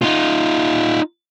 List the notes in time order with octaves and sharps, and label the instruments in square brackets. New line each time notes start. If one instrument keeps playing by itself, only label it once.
[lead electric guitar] D#4 F4